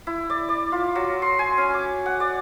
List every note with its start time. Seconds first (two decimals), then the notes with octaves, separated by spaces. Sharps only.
0.07 E4
0.30 D5
0.49 D5
0.72 F4
0.95 F#3
1.22 C6
1.39 G#5
1.58 C#4
1.74 D6
2.06 F#5
2.20 D5